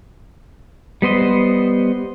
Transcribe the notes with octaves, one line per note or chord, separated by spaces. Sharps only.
G3 B3 C5 D#5